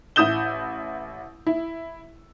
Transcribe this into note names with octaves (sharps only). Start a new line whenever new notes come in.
A1 E4 D#6 G6 E7 G7
E4